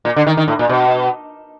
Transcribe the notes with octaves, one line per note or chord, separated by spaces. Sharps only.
A#2
D3
D#3
D#3
A2
A#2
B2